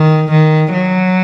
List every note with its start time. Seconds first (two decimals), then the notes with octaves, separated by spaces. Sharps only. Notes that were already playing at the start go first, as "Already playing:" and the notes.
Already playing: D#3
0.32 D#3
0.74 F#3